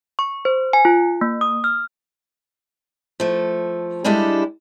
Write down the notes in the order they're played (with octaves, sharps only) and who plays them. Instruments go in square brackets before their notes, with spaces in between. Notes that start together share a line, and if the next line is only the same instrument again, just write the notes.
[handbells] C#6
C5
G#5
F4
A#3
D#6
F6
[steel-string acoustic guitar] F3 A3
G3 G#3 D4 E4 G4 A4